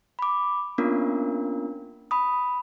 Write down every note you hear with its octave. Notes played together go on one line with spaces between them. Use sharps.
B5 D6
A#3 B3 C#4 D4 F4 A#4
B5 D#6